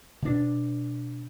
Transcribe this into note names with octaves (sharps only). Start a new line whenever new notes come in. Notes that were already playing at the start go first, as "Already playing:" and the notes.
B2 D4